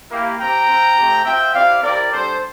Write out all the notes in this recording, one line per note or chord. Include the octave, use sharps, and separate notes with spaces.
A#3 E4 G4
C4 G4 G5 A#5
C4 F4
A3 C4 G4
C4 F4 E5 G5
C4 E4 G4 D5 F5
C4 E4 G4 A#4 D5
G3 D4 G4 A4 C5